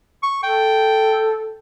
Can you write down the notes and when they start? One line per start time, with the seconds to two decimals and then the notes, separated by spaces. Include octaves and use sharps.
0.23 C#6
0.43 A4 G5